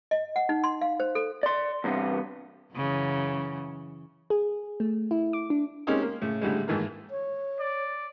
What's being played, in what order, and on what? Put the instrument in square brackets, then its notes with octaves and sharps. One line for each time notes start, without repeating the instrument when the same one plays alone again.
[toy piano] D#5
F#5
D#4
C6
F5
C5
A4
[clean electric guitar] D5 C6
E2 G2 C3 B3
[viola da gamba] F#2 C#3 E3
[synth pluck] G#4
A3
E4
D6
D4
[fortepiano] G#3 A#3 C4 C#4 D#4 G4
A#3
A2 C#3
A2 D3 G3 G#3
G#2 D#3 E3 A3 A#3
[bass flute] C#5
[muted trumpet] D5